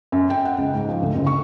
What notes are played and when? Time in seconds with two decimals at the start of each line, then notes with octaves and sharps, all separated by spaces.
0.12 F#2
0.30 G5
0.45 F#5
0.58 C#2
0.74 G#2
0.89 F3
1.02 D2
1.15 F#1
1.27 C#6